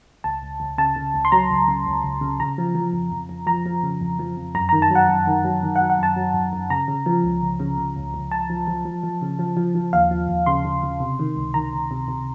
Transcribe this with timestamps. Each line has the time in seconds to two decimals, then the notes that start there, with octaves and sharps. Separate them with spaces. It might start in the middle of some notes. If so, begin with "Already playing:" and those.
0.24 C#2 A5
0.42 C#2
0.60 C#2
0.78 C#3 A5
0.96 C#3
1.14 C#2
1.25 C6
1.32 F#3 A#5
1.50 C#2
1.68 C#3
1.86 C#2
2.04 C#2
2.21 C#3
2.40 C#3 A#5
2.58 F3
2.75 F3
2.93 F2
3.11 F2
3.29 F2
3.47 F3 A#5
3.66 F3
3.83 C#3
4.01 F2
4.19 F3
4.37 F2
4.55 F#2 A#5
4.69 D#3 A#5
4.82 A5
4.90 F#3 F#5
5.09 F#2
5.27 D#3
5.45 F#3
5.63 D#3
5.76 F#5
5.81 F#3
5.90 F#5
5.98 F#2 A5
6.16 F#3
6.34 F#2
6.53 F#2
6.70 C#3 A#5
6.88 C#3
7.06 F3
7.24 C#2
7.42 C#2
7.60 C#3
7.78 C#3
7.96 C#2
8.14 C#2
8.31 C#2 A5
8.50 F3
8.67 F3
8.85 F3
9.03 F3
9.22 C#3
9.39 F3
9.57 F3
9.75 F3
9.93 D#2 F5
10.11 F3
10.28 D#2
10.46 C#3 C6
10.65 C#3
10.83 C#3
11.00 C3
11.19 D#3
11.36 C#2
11.54 D#3 A#5
11.73 C#2
11.91 C3
12.08 C3